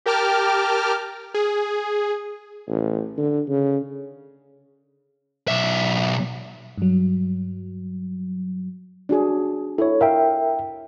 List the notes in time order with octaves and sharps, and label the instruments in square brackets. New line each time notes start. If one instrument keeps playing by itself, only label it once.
[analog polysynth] G4 A#4 G5 A5 D6 F6
G#4
[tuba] A1
D3
C#3
[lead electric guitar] B1 E5
[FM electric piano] G2 F#3
[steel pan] D4 F#4 G#4
[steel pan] E4 [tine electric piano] A4 C#5
[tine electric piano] A#4 E5 G5 [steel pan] F5